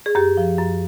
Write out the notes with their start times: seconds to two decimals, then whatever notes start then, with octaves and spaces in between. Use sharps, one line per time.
0.06 G#4
0.15 F#2 G4
0.37 F3
0.59 F#2